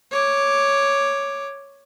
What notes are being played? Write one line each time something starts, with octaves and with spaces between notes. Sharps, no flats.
C#5 D6